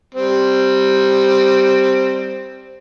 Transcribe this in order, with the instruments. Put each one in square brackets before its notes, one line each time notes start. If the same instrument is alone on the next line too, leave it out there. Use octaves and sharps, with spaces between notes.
[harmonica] G3 C4